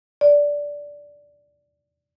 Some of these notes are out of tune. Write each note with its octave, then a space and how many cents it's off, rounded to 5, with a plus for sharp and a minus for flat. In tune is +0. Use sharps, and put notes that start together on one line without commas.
D5 -10